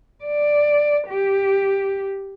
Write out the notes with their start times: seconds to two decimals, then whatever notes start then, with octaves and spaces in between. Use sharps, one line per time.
0.25 D5
1.08 G4